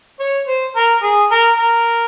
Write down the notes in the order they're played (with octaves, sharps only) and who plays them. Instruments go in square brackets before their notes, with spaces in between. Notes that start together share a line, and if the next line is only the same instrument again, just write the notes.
[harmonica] C#5
C5
A#4
G#4
A#4
A#4